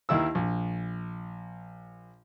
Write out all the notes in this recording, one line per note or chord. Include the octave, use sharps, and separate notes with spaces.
D#2 D#3 E4 E6
A#1